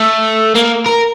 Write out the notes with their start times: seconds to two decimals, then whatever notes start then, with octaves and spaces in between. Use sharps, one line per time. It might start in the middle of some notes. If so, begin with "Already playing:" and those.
Already playing: A3
0.55 A#3
0.86 A#4